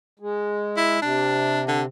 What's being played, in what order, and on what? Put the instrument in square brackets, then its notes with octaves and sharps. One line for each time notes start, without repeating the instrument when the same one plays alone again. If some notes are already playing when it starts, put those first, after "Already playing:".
[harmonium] G#3
[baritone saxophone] E4
[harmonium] C3 [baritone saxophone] D4
[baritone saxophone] D3